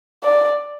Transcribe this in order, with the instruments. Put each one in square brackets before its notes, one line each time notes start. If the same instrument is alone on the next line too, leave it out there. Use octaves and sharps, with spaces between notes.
[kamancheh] D5